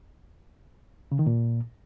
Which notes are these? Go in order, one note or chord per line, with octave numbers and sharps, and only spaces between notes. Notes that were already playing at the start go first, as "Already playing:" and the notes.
C#3
D#3
A#2